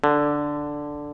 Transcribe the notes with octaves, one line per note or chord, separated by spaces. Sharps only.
D3